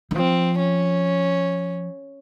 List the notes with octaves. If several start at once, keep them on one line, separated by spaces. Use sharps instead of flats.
D#3
F3 C4
C#4